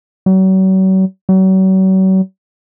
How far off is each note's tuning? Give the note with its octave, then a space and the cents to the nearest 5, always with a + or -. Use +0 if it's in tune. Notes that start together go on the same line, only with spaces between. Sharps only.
F#3 +40
F#3 +40